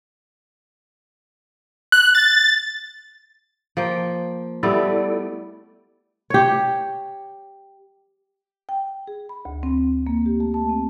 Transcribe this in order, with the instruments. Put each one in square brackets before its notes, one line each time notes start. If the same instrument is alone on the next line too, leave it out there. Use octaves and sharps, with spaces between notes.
[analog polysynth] F#6
A6
[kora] F3 A#3 G5
[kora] G3 A3 B3 [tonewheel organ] E4 A4 D5
[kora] G4 C#5
[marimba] G5
G#4
B5
D2
C4
A#3
G4
A3
A5
C4